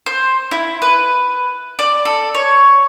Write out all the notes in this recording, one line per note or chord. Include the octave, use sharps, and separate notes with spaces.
C5
E4
B4
D5
A4
C#5